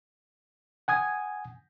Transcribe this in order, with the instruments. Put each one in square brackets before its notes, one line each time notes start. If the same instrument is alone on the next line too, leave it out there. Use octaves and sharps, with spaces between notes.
[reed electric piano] F#5 G#5 D#6 G#6